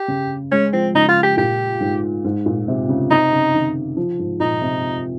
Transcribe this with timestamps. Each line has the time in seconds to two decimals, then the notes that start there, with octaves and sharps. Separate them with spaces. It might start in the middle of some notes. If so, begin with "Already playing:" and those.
Already playing: G4
0.08 C#3
0.52 G#3 C#4
0.73 F3 C4
0.94 C#3 D#4
1.08 F4
1.23 G4
1.37 A#2 G4
1.80 G#2
2.24 G#2
2.46 A#2
2.68 C3
2.89 C#3
3.10 C3 D#4
3.32 C#3
3.54 D#3
3.97 F3
4.19 G#2
4.40 A#2 D#4
4.62 C3